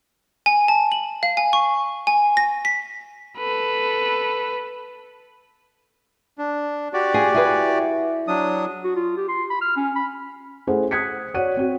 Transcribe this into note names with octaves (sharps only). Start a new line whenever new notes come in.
G#5
A5
F#7
F5
G#5
C#6
G#5
A#6
B6
A4 B4
D4
F#4 G4 D5
F4 G#4
E4 G#4 B4
F#3 D4 D#6
F#4
F4
G4
C6
B5
F6
C#4
B5
A3 C#4 E4 G#4 C5 F#5
D#6 F#6 G#6 B6 C#7
F#4 C#5 D5 F#5 F#6 D#7
C4 F#4